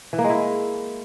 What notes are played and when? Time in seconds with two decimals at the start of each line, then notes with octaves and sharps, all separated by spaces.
0.13 E3
0.18 A#3
0.24 G#3
0.30 E4